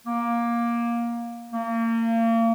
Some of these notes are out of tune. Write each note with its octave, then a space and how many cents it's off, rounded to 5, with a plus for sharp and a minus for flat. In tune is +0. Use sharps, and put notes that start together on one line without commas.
A#3 +15
A#3 -35